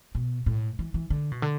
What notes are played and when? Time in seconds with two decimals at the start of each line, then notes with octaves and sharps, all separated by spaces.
0.15 B2
0.46 A2
0.79 E3
0.94 E3
1.10 D3
1.32 B2
1.42 D3